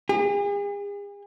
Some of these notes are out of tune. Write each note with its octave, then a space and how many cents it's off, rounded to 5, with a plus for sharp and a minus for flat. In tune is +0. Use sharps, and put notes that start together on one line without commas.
G#4 -45